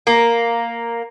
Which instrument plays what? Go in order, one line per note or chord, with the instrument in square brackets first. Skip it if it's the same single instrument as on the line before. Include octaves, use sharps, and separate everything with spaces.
[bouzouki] A#3